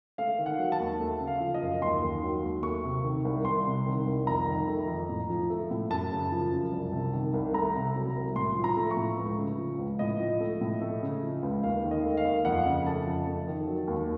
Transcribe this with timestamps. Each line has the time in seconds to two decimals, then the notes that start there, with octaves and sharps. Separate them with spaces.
0.18 A3 F5
0.39 D#3
0.46 F#5
0.59 F#3
0.72 A5
0.80 D#2
1.00 A3
1.20 C#3
1.27 F5
1.40 F3
1.54 D#5
1.62 F#2
1.81 D#2 C6
2.03 D#3
2.23 F#3
2.43 D#2
2.63 A3 C#6
2.84 C3
3.04 D#3
3.25 C2
3.45 C2 C6
3.66 C3
3.86 D#3
4.06 C2
4.27 F2 A#5
4.48 D#3
4.67 A3
4.88 F2
5.09 A2
5.30 F3
5.50 A3
5.71 A2
5.90 F#2 A5
6.12 C#3
6.32 F3
6.51 F#2
6.72 C2
6.92 C3
7.13 D#3
7.34 C2
7.54 A3 A#5
7.75 C3
7.96 F#3
8.16 C2
8.36 A2 C6
8.56 F3
8.64 A#5
8.77 A3
8.91 C#6
8.97 A2
9.18 C#2
9.38 C#3
9.58 F3
9.79 C#2
9.99 A2 D#5
10.20 F3
10.40 A3
10.61 A2
10.82 A3
11.02 C#3
11.23 F3
11.43 C#2
11.63 D#2 F5
11.84 D#3
11.91 D#5
12.04 A3
12.17 F5
12.25 D#2
12.45 F2 F#5
12.65 C#3
12.86 A3 A5
13.07 F2
13.27 A3
13.48 D#3
13.67 F#3
13.88 D#2